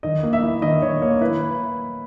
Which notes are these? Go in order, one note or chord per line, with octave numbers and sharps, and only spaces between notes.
D#3 D#5
A#3
E5
E4
D#3 D#5
D#3 C#5
A#3 C#5
E4 B4